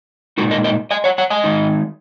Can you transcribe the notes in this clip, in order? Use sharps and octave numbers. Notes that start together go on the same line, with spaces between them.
A#2 G#3 D#4 F#4 A#4
A#4 D#5
A#4 D#5
D#5 G#5
C#5 F#5
C#5 F#5
D#5 G#5
D#3 G#3 D#4